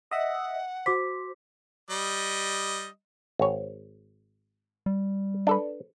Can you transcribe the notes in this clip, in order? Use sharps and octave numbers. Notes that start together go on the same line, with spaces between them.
D#5 E5 F#5
F#4 C5 D6 B6
G3 D#5
G#1 C#5
G3
D4 A4 B4